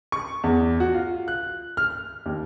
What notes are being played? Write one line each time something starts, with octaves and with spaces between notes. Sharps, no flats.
C#6
E2
F#4
F4
F#6
F6
D#2